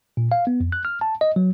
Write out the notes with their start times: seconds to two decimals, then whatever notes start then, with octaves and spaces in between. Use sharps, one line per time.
0.17 A#2
0.32 F5
0.47 B3
0.60 F2
0.72 F#6
0.85 F6
1.01 A5
1.21 D#5
1.36 F#3